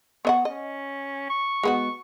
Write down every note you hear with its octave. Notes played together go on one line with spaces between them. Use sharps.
B3 D#5 F#5 C#6
C#4 D#5
C#6
G#3 B3 F#4